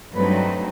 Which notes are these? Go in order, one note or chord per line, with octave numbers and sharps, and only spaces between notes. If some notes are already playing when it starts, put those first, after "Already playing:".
G2 F#3 A3 C4 D#4 B4